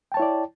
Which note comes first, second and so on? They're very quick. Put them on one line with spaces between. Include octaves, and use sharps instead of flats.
G5 A5 C#5 E4 D5